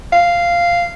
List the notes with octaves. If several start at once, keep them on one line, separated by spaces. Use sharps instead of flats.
F5